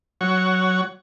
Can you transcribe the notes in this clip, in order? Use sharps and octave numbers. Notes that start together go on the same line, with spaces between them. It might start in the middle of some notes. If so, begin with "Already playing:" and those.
F#3 C#5 F#5 C#6